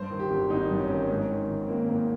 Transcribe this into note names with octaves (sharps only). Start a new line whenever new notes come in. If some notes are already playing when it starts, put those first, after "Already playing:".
Already playing: G2 C5
D#3
G4
G#1
G#1 D#4
G2
C#4
D#3
G#2
D#3
G#1
C4
G#1 A#3
G#2 A#3